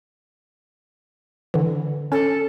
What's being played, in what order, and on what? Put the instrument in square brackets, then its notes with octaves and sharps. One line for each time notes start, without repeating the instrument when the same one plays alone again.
[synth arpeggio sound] D3 E3
[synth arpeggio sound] C#4 [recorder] A4